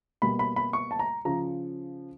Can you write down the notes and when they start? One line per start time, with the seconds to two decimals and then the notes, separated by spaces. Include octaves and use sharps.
0.22 B2 G3 A#3 B5
0.39 B5
0.56 B5
0.73 C#6
0.91 A5
0.99 A#5
1.25 C#3 F3 A#5